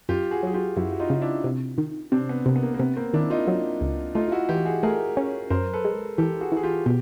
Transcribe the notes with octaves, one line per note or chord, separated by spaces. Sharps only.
F#2 F4 G4
F#4 G#4
F#3 G#4
F4 G4
F#2 E4 F#4
F#4
D#4 F4
C#3
D4 E4
C3
D#3
C3 C4 D4
B3
C3 A#3
B3
A#3
A#3
C3 B3
A#3 C4
D#3 D4 E4
D#4 F4
F#3
C#2
A3 D#4 F4
F4
E4 F#4
E3 F4 G4
F#4 G#4
A3 G#4 A#4
C#4
F#2 A#4 C5
A4 B4
G#3
E3 G4 A4
F#4 G#4
E3 G#4
F4 G4
B2 G4